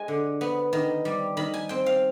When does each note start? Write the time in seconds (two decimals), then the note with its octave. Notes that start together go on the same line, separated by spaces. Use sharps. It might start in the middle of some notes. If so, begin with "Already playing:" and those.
Already playing: G#3 G#5
0.08 D3
0.41 B3
0.73 D#3
1.05 G3
1.37 D#3 B5
1.54 G#5
1.69 C4 G5
1.86 F5